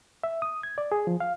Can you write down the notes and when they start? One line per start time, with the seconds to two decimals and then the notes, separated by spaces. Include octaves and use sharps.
0.24 E5
0.42 D#6
0.63 G#6
0.78 D5
0.92 G#4
1.07 F3
1.20 F5